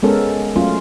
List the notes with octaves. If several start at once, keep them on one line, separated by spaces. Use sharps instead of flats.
G#3 B3 C#4 A4 A#4
F#3 A3 C#4 F4